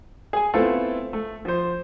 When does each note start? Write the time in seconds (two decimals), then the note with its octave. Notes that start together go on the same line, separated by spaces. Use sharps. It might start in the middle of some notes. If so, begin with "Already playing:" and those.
0.33 G#4 G#5
0.54 A3 B3 C4 E4 F4 A4
1.13 A3
1.45 F3 C5